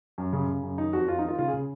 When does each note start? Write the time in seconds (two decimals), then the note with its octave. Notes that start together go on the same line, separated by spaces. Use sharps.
0.18 F#2
0.33 C#3
0.48 C#3
0.63 F#2
0.78 D#3 D#4
0.93 F2 F#4
1.08 F2 F4
1.19 D#3 D#4
1.28 F4
1.38 C#3 F4
1.48 G#4
1.54 C#3